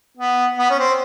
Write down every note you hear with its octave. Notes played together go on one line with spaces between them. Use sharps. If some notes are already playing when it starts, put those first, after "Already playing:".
B3
B3
C#4
C4